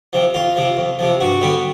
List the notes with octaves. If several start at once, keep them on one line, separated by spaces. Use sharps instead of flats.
C3 F3
F2 F4
C3 F3
F2
C3 F3
G2 F#4
D3 G3 B3